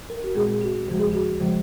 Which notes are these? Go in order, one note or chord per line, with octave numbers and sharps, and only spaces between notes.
A#4
F#4
A#2 G#3 C4 G#4
F#4
D#2 C#3 F3 G#3 F#4
G#4
F#4
C#3 F3 G#3